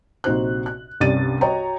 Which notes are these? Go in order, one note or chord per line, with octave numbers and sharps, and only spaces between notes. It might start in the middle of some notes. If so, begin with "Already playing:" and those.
A#1 C3 D#4 F#4 C5 F#6
F#6
C2 G2 C#4 D5 A6 D#7
F#4 C#5 D#5 G5 A#5